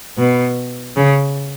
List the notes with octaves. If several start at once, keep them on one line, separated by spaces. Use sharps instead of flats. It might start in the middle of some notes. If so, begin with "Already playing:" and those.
B2
C#3